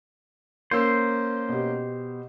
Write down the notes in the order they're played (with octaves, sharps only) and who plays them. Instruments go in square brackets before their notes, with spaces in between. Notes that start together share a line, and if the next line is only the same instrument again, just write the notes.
[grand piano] A#3 C#4 E6 [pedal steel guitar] C5
[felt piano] B2 G4